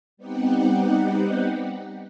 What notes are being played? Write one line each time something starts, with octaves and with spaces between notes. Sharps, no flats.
G3 B3 C4 D#4 G4 F#5